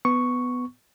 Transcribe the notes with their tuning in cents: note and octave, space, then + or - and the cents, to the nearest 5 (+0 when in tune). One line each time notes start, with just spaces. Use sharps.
B3 +10 C#6 +0